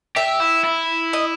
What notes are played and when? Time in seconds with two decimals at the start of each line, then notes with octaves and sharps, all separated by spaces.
0.16 G4 E5
0.40 E4
0.64 E4
1.13 D#5